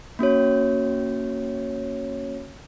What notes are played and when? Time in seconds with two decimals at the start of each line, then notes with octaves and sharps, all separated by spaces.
0.19 A#3 C#4 F#4 C#5